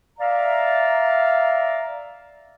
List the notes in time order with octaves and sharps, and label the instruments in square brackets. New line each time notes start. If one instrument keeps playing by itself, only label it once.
[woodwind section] D5 E5 F5 A#5